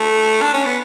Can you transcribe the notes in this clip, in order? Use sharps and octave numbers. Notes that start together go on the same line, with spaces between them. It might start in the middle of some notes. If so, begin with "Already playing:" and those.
Already playing: A3
D4
C#4
B3